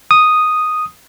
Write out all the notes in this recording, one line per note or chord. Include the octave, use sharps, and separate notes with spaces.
D#6